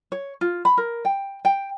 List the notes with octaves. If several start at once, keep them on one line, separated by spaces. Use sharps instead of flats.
C#5
F4
B5
A#4
G5
G5